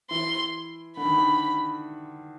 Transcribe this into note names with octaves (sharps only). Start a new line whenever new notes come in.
E3 C6
D3 B5
D#3
D3